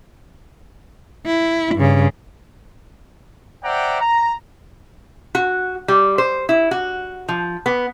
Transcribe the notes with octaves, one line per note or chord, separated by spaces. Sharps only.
E4
G2 C#3
C5 D5 E5 F#5 G5 A#5
A#5
F#4
G3
C5
E4
F#4
F3
B3